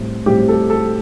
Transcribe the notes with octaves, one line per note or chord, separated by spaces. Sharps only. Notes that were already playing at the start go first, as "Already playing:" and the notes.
Already playing: A2 G3 C4
A2 G3 C4 G4
A4
A4